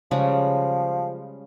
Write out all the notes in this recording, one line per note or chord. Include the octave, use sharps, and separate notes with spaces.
C#3 F3 G3 G#3